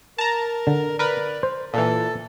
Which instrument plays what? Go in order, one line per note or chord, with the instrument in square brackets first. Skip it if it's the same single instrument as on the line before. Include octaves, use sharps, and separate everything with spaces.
[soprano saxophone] A#4 [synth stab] A5 A#5
[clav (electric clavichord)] D3
[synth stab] A#4 B4 [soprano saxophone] D5
[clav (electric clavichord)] C5
[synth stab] A#2 E3 [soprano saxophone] A4